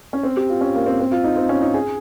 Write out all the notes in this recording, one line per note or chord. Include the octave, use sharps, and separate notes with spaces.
C#4
C4
G4
F4
C#4
A#3
C4
C4
F4
D#4
C4
C#4
D#4
G#4